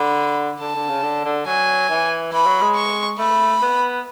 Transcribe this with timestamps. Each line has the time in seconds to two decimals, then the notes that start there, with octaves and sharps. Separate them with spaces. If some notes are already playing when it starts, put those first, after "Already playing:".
Already playing: D3 B5
0.60 D3 A5
0.75 D3
0.89 C#3
1.03 D3
1.25 D3
1.46 F#3 G#5
1.89 E3
2.32 E3 B5
2.46 F#3
2.61 G#3
2.75 C#6
3.18 A3 B5
3.62 B3